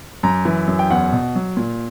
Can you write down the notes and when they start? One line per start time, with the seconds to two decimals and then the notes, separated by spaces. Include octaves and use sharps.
0.23 F#2 A#5
0.45 E3
0.68 F#2
0.79 G5
0.91 E2 F#5
1.12 B2
1.35 F#3
1.57 A#2